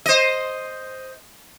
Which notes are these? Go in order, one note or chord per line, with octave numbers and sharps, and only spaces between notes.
C5 D#5